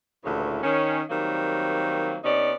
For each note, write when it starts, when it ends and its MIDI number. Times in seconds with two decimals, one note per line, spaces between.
0.24 0.63 38
0.24 0.63 46
0.24 0.63 49
0.24 0.63 52
0.63 1.02 51
0.63 1.02 61
1.10 2.18 51
1.10 2.18 54
1.10 2.18 55
1.10 2.18 58
1.10 2.18 60
2.24 2.53 48
2.24 2.53 59
2.24 2.53 61
2.24 2.53 63
2.24 2.53 74